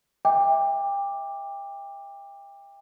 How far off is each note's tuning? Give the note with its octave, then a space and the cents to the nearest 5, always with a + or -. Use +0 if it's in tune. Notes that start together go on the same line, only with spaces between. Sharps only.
E5 -25 G5 +30 D6 +0